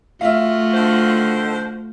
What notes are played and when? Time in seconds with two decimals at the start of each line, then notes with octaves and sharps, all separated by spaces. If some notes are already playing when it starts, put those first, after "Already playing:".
0.21 A3 F4 F#4 E5 F5
0.74 D3 D#3 C5